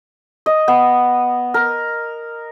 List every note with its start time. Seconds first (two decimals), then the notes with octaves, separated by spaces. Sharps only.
0.46 D#5
0.68 B3
1.54 A#4